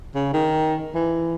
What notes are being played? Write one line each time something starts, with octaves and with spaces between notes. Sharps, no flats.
C#3
D#3
E3